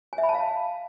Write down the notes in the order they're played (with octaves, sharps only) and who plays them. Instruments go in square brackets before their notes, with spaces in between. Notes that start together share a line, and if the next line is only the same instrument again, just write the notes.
[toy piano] G#5
E5
B5
A5
F5